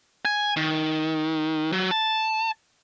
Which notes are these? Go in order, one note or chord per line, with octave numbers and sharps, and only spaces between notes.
G#5
D#3
F#3
A5